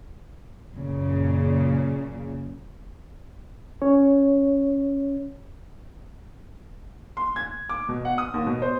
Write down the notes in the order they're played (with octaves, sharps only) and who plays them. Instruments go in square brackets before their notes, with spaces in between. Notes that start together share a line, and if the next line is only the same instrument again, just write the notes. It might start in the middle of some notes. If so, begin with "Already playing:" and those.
[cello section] F#2 A#2 C#3
[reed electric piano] C#4 C#5
[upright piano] C6
G#6
D6
B2
F#5
D#6
D#2
B2
C5